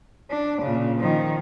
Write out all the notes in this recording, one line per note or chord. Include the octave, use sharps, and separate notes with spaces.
D4
A#2 C#3
D#3 F3